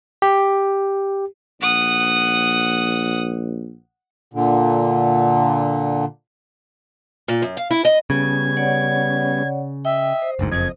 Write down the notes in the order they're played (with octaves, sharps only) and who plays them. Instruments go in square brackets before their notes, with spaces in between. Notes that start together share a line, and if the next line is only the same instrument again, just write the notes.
[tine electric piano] G4
[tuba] A#1 [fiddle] F#5 D#6
[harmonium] A#2 D3
[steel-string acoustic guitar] A#2
F#2
F5
E4
D#5
[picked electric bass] C#3 [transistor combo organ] G3 B3 C#4 [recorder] G#6
[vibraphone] C#5 D5 F#5
[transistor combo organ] D#5 [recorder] E5 [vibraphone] G5
[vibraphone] C5
[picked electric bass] F#1 D2 G#2
[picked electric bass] F#1 F2 [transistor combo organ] D#5 [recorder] G#6